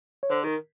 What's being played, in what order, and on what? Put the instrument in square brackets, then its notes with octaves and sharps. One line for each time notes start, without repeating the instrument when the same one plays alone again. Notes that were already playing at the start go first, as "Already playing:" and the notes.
[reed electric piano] C#5
[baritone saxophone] D3 [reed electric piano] C5
[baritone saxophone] D#3 [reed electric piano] A#4